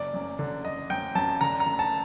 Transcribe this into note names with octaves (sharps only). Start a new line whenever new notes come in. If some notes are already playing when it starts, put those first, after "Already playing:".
Already playing: F#1 D5
F#2
D3
F#1 D#5
F#2 G5
F#2 A5
D3 A#5
A#5
D3
A5